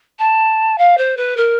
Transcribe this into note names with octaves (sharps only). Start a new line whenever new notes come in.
A5
F5
C5
B4
A#4